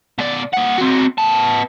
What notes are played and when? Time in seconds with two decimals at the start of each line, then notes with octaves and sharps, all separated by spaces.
0.19 B2 D5
0.54 A#3 F#5
0.78 C4 F#4
1.18 B3 A5